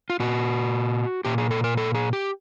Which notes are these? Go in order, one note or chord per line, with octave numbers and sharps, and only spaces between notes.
F4
A#2 F#4
A#2 G4
G#4
A4
A#4
A4
G#4
G4